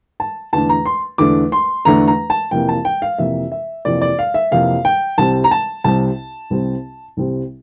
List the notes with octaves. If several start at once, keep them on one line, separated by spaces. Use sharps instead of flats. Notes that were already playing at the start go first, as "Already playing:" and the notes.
A5
E2 D3 A3 D4 A5
A#5
C6
E2 D3 A3 D4 D6
C6
E2 D3 A3 D4 A#5
A#5
A5
F2 C3 E3 A#3 G5
A5
G5
F5
F2 C3 E3 A#3 E5
E5
F2 C3 E3 A#3 D5
D5
F5
E5
F2 C3 E3 A#3 F5
G5
C2 C3 G3 C4 A5
A#5
A5
C2 C3 G3 C4 A5
C2 C3 G3 C4
C2 C3 G3 C4